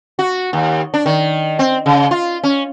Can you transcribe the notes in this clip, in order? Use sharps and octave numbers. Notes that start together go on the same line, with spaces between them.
F#4
D#2
D4
D#3
C4
C#3
F4
C#4